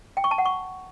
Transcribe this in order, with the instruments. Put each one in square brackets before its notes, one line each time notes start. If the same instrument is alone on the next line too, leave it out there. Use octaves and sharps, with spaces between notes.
[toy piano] G5
C#6
A5
F#5
C#6